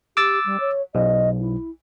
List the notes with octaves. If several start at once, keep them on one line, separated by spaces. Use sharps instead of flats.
G4 D6 E6 A6
G3
C#5
B1 D#5
E4